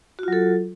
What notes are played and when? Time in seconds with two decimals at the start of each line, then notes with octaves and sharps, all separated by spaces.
0.19 F#4
0.23 F4
0.28 F#3
0.33 A4